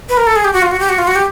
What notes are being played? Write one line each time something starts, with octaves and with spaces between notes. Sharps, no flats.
B4
A#4
A4
G#4
G4
F#4
F4
F#4
G4
F#4
F4
F#4
G4